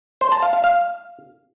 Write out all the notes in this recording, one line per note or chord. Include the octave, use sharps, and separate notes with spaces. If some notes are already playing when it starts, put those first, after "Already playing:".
C5
A5
F5
F5
F5